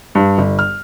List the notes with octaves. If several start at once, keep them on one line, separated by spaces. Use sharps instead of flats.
G2
G1
F6